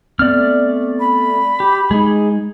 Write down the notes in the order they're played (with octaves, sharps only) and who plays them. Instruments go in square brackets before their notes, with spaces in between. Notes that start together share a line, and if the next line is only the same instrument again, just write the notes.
[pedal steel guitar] A3 D5 F6 [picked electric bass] B3 C4
[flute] B5
[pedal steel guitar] G4
[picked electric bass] G#3 [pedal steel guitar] D#4 G#4